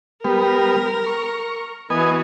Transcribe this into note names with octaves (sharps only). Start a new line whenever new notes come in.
G3 B3 A#4
C#6
E3 B3 F#4 D#5 G#5